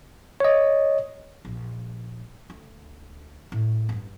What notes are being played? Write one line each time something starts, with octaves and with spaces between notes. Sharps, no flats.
C#5 D#5
A#1
D2
A2
G2 F4